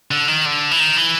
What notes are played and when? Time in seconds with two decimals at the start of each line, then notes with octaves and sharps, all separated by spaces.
0.11 D3
0.28 D#3
0.46 D3
0.71 E3
0.80 D#3
0.97 E3